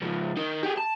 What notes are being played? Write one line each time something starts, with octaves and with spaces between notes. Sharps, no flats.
C#2 F3
D#3 D#4
G4 G#4
A5